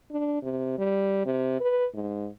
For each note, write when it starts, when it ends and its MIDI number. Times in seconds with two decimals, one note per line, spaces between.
0.11 0.41 62
0.43 0.75 48
0.79 1.23 55
1.26 1.57 48
1.61 1.86 71
1.95 2.29 44